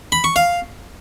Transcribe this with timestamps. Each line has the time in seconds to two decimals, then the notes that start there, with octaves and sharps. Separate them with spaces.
0.12 B5
0.24 C#6
0.36 F5